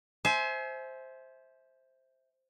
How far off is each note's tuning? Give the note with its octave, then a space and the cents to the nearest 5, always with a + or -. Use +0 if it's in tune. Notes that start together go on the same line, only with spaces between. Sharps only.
C5 +0 E5 -15 G#5 +35